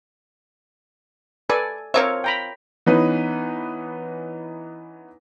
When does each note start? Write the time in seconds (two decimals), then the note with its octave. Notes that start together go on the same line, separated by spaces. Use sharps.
1.50 A4 B4 D5 G#5
1.94 F3 C4 A#4 C#5 E5
2.24 G5 A#5 B5
2.86 E3 B3 C#4 D#4 B4